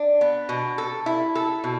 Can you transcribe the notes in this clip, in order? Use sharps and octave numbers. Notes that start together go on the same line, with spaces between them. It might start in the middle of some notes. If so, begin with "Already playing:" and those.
Already playing: D4
B3
B2
A4
E4
A4
B2